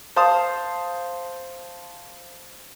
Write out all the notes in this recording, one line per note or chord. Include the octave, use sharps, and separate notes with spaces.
C5 F5 A5 C6 D#6